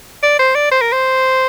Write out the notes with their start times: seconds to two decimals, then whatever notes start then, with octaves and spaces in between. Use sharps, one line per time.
0.23 D5
0.39 C5
0.55 D5
0.71 C5
0.81 A#4
0.92 C5